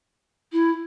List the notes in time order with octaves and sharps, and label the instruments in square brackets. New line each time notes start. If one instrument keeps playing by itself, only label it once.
[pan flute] E4